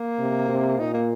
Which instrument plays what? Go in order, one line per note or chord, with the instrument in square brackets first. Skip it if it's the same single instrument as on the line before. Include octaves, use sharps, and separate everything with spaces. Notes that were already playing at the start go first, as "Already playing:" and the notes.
Already playing: [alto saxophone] A#3
[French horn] C3
C3
[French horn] A#2 [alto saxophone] D#4
[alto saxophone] A#3